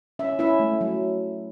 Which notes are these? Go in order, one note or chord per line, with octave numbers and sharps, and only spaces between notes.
C#4 E5
C#4 E4 E5
A3
F#3